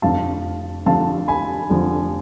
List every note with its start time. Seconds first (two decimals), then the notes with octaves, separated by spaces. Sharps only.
0.02 F1 F2 D3 F3 F5 A5
0.86 F1 F2 D3 F3 F5 A5
1.28 G#5 B5
1.70 F1 F2 D3 F3